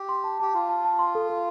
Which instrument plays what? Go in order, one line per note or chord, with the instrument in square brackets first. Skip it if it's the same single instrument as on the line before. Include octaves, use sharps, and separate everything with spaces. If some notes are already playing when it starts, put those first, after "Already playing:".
Already playing: [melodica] G4
[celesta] C6
A5
[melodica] G4 [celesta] A5
[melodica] F4 [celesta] A5
[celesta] A5
A5
C6
A4
A4